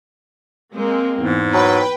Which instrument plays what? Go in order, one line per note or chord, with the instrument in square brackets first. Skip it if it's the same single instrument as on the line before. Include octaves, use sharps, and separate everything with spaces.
[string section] G#3 A#3 C4
[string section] E2 [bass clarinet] G#2
[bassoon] F#3 [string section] B4 G5